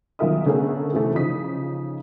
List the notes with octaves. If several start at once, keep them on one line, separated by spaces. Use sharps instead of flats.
B1 D#3 F4 A#4 E5 D#6
D3 A3 B3 C#4 G#4 A#4
C3 E3 A3
C#3 F3 D#4 D#6 B6